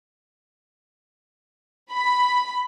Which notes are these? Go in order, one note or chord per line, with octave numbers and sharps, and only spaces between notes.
B5